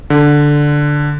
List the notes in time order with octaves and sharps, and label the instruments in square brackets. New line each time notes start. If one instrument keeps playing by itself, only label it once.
[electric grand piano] D3